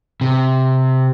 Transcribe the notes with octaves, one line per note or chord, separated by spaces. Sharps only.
C3